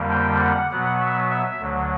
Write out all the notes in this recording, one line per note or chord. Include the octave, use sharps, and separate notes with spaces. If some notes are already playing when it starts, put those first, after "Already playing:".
Already playing: F2 D3 G3 A#3
G5
F#5
B2 F#3 B3 F#5
E5
E5
D2 D3 F#3